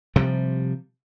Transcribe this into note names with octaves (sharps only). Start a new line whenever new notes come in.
C3 F3 G3